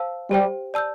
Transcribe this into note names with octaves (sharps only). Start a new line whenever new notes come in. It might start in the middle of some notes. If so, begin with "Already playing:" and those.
Already playing: C5 F5 A5 E6
G3 G4 C5 G5
D5 A5 E6 G6